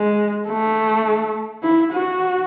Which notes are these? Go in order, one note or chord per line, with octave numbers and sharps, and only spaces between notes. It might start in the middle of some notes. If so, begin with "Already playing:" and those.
Already playing: G#3
A3
E4
F#4